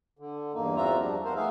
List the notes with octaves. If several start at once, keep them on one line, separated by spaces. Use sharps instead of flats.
D3
E2 G2 A#3 D#4
E2 C4 F4 F#4 E5 A#5
F3 G3 D4
B3 A#4 C5
A3 B3 D#4 G#4 E5 F5